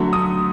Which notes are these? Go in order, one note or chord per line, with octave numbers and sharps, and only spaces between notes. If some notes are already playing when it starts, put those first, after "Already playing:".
Already playing: D3 F#3 A3
D#6